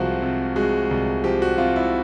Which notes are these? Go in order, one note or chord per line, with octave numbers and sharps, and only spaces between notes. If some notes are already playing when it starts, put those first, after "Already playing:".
Already playing: C2 F3 G#3 F4 F#4
C3
G#3 F#4
C2
F3 G4
F#4
C3 F4
E4